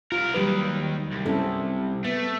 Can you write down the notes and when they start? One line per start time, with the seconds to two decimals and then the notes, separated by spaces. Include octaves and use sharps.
0.12 C2 F4 A#4
0.34 D#2 D#3 F#3 G3 B4
1.11 C2
1.26 C3 C4 C#4 E4 A4
2.05 A3 B3